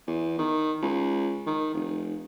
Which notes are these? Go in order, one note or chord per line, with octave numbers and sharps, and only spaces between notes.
E2
D#3
C#2
D#3
F1